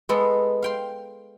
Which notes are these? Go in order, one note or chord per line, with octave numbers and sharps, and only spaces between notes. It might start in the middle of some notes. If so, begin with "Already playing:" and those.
G#3 B3 A4 D#5
F5 G5 C6